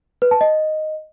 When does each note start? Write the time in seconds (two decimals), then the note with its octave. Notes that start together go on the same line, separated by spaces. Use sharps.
0.22 B4
0.31 A5
0.41 D#5